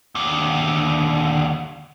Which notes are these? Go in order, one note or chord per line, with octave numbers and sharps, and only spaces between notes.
D#2 D3